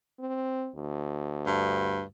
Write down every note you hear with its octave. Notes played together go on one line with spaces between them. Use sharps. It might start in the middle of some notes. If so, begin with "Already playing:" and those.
C4
D2
G2